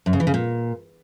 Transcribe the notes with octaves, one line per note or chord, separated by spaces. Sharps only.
F#2
C#3
E3
C#3
A#2